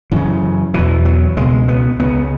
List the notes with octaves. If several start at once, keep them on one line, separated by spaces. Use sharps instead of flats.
F#2 C#3 E3
E2 B2 E3
F#3
C#2 B2 G#3
B3
C#2 C#3 B3